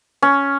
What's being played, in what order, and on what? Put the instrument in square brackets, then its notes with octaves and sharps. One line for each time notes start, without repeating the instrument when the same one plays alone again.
[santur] C#4